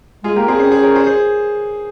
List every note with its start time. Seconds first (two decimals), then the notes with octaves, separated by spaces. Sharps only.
0.24 G#3 F4 G#4
0.36 A#3 G4 A#4
0.47 C4 G#4 C5
0.59 C#4 G#4 C5
0.72 G#4 C5
0.83 A#4 C#5
0.96 G#4 C5
1.06 G#4 C5